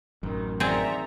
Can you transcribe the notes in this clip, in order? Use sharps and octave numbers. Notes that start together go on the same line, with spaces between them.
A1 F#2 D#3
D#3 C4 G#4 C5 D5 E5 F#5 A#5